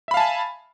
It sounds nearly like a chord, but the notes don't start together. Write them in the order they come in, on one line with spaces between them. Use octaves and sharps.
E5 B5 F5 A5 G#5